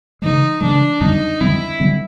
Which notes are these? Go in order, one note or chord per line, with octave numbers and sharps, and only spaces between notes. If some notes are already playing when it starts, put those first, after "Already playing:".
C#3 E3 G#3 D#4
C#3 E3 G#3 D4
F2 D3 G3 C4 D#4
F2 D3 G3 C4 E4
D3 G3 C4